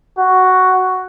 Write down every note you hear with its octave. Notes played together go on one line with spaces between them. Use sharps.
F#4